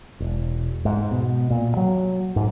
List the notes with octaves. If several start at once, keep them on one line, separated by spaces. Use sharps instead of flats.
E1
G#2
B2
A#2
F#3
G#2